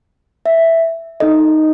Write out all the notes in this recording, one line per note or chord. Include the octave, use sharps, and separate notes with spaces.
E5
D#4 A4 D#5